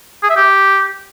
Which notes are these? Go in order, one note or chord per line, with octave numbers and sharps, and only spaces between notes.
G#4
E5
G4